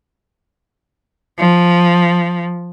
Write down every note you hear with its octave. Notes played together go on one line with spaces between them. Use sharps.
F3